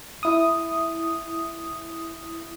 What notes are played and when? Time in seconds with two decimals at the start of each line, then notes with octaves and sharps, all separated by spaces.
0.23 E4 D#6